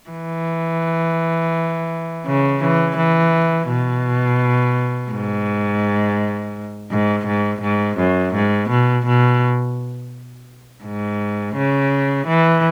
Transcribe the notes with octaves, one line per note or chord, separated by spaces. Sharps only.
E3
C#3
E3
E3
B2
G#2
G#2
G#2
G#2
F#2
G#2
B2
B2
G#2
C#3
E3